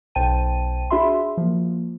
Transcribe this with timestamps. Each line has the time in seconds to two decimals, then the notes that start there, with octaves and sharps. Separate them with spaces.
0.15 B1 C5 G5 A5 D#7
0.90 D4 F#4 G#4 E5 B5 C6
1.37 F3 A#3